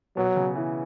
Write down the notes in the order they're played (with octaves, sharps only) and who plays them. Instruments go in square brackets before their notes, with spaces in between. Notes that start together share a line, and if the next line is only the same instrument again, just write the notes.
[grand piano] B2 [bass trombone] F#3
[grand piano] C#3
E3